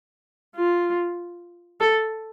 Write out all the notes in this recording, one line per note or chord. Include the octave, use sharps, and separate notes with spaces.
F4
A4